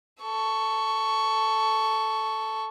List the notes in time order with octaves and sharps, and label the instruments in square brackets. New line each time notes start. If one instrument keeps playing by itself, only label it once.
[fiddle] A4 C#6